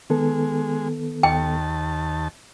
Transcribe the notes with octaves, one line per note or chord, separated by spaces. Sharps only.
D#3 G#3 B3 A4
D#2 G5 A5